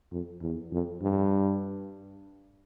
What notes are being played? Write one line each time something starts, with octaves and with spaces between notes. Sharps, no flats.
F2
E2
F2
G2